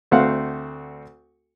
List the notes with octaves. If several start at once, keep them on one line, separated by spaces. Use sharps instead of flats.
D2 A3 C4 F5 F#5